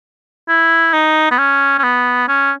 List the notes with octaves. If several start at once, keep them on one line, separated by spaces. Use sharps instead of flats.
E4
D#4
B3
C#4
C#4
B3
C#4